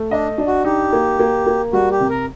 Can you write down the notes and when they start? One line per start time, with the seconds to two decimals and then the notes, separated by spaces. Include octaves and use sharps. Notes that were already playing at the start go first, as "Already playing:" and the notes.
Already playing: A3
0.11 D4 D#5
0.38 D4
0.47 F#4
0.64 D#4 G4
0.93 A#3
1.19 A#3
1.47 A#3
1.73 G3 F#4
1.91 G4
2.00 C3
2.10 A#4